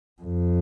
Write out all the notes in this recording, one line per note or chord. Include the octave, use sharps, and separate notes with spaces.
F2